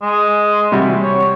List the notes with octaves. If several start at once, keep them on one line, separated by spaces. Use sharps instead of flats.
G#3
C3 G3 F#4
C#5